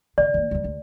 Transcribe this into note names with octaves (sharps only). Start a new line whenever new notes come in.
D3 E3 D5
E3 A#3
D2 G3
D2